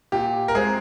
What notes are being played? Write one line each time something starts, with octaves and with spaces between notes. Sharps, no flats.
A#2 G4
A#4
G#3 C4 G#4